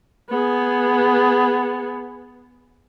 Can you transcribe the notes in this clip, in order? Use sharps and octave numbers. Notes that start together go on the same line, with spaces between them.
B3 G#4